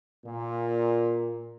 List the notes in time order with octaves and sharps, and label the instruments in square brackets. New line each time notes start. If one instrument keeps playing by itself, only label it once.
[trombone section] A#2